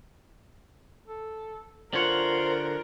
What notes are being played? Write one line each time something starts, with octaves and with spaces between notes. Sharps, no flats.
A4
D3 F4 A#4 C5 C#5 F#5